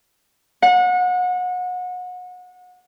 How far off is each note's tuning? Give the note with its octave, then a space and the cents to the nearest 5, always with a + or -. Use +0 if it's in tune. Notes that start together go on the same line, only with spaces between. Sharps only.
F#5 -30